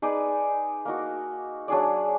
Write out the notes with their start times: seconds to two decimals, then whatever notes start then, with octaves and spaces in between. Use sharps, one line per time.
0.02 D#4 G#4 B4 D5
0.85 A#3 D#4 F#4
1.68 F#3 D4 G#4 D5